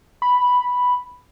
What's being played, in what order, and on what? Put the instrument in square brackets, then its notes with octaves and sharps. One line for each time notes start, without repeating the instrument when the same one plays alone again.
[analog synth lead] B5